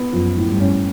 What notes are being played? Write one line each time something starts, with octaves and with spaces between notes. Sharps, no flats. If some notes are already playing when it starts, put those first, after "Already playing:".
Already playing: B3
F#2 F3
A2
G2
C#4